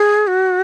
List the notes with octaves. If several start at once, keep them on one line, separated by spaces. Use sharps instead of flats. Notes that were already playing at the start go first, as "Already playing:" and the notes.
Already playing: G#4
F#4